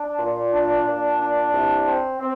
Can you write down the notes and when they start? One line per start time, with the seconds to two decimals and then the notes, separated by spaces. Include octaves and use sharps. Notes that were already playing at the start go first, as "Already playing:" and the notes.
Already playing: D4
0.19 A#2
0.53 D4
0.86 A#2
1.19 D4
1.52 C2
1.86 C4
2.19 C4